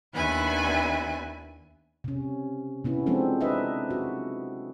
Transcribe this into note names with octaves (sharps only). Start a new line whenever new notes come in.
D#2 B3 D4 E4 G#5 F#6
C3 C#4
C3 B3 C#4 E4
F3 G#3 C4 D4 A4
D4 D#4 B4 D#5 E5
F#4